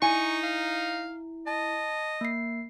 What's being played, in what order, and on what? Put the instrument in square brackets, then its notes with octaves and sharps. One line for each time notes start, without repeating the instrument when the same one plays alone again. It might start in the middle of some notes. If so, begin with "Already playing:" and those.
[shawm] D#4 [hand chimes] E4 [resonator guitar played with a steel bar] G#5 [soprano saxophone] C#6
[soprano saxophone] F5
[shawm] D#5 [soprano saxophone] A5
[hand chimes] A#3 C7